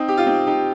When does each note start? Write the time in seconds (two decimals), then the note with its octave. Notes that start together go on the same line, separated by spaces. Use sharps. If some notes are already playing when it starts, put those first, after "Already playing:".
Already playing: C4 D#4
0.08 G4
0.17 F4
0.26 C4 D#4
0.47 D#4 G4